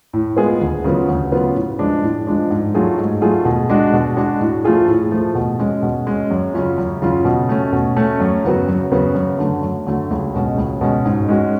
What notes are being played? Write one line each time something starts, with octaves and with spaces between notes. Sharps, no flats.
A2
G#3 B3 F4 G#4
D2
C#3 F#3 B3 F4
D2
C#3 F#3 B3 F4
A2
F3 G#3 D4
A2
F3 G#3 D4
G#2
F#3 A3 F4 G#4
G#2
F#3 A3 F4 G#4
B2
G#3 D4 F#4
B2
G#3 D4 F#4
A2
F3 A3 F4 G#4
A2
F3 A3 F4 G#4
B2
G#3 C#4
B2
G#3 C#4
F#2
C#3 F#3 C#4 F4
F#2
C#3 F#3 C#4 F4
B2
A3 C#4
B2
A3 C#4
F#2
C#3 F#3 B3 F#4
F#2
C#3 F#3 B3 F#4
F#2
D3 F#3 A3
F#2
D3 F#3 A3
C#2
B2 G#3 C#4
C#2
B2 G#3 C#4
G#2
G#3 C#4 F#4